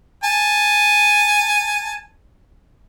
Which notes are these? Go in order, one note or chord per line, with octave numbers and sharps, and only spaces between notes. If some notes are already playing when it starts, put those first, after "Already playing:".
G#5 A5